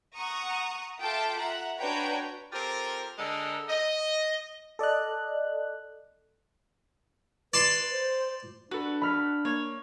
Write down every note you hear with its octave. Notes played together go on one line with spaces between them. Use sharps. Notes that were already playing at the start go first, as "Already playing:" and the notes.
F#5 A#5 C#6 D#6
F4 A4 E5 G5 A5 D6
E5 F#5 A#5
D4 F#4 B4 C#5 G5 A#5
C4 F4 G4 A4 A#4
D3 G#3 A4 A#4
D#5
A4 D5 D#5 F#6
B4 D5 A5 C6
C5
D4 F#4 A4 B4
B5 F6 B6
A#3 C#5